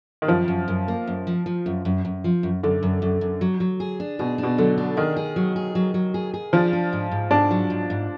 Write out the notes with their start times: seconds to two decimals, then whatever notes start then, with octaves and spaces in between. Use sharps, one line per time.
0.22 D#3
0.28 F#2 F3
0.48 F#2
0.68 F#2
0.88 A#3
1.07 F#2
1.27 F3
1.46 F3
1.66 F#2
1.85 F#2
2.05 F#2
2.24 F3
2.43 F#2
2.63 F#2 D3
2.83 F#2
3.02 F#2
3.21 F#2
3.41 F#3
3.60 F#3
3.80 G#4
4.00 D4
4.19 B2 G#4
4.38 D4
4.43 B2
4.58 D3 F#3
4.78 D4
4.97 D#3 G#4
5.16 G#4
5.36 F#3
5.56 G#4
5.75 F#3
5.94 F#3
6.14 G#4
6.34 G#4
6.53 F3 D4
6.73 D4
6.93 G#2
7.11 G#2
7.31 G#2 D4
7.51 F#3
7.70 G#2
7.90 G#2